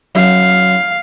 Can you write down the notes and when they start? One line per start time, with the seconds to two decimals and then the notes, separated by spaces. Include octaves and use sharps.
0.15 F#2 F5